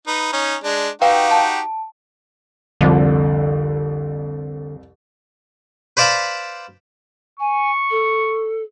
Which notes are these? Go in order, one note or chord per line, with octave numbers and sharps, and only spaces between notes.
D#4 B4
C#4 D#4
G#3 D4
D#4 F#4 G4 B4 F5 G5
A5
C2 F2 D3
B4 C5 D5 F5 A5 B5
G#5 C#6
A4